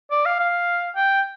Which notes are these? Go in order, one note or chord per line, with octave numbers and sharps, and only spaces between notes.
D5
F5
F5
G5